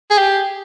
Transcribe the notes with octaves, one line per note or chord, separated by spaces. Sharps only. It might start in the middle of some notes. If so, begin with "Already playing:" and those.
G#4
G4